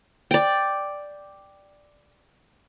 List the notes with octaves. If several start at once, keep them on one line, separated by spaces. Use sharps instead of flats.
D5 G5